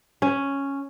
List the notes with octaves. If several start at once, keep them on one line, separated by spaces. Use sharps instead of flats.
C#4